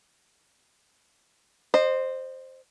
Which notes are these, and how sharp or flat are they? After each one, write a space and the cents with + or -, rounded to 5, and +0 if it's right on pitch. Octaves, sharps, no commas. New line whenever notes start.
C5 +5 D#5 -30